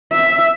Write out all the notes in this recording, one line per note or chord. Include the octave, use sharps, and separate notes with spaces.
E5